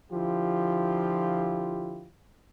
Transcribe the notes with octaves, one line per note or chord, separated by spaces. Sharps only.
D3 F3 E4 F4 G4